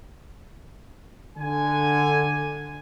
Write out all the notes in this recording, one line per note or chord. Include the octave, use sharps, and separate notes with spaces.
D3 G#5